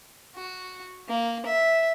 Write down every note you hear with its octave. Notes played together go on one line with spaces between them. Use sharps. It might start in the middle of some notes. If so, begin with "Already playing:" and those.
F#4
A#3
E5